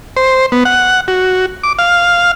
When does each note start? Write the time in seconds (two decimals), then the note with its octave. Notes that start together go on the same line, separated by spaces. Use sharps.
0.17 C5
0.52 B3
0.65 F#5
1.08 F#4
1.64 D6
1.79 F5